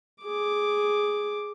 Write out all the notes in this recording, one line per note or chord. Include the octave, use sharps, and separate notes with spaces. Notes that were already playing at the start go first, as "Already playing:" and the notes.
G#4 D6